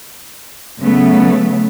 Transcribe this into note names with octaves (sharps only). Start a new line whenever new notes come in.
C#3 F#3 A3 B3